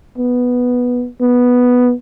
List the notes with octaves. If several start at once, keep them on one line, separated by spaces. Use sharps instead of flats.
B3
B3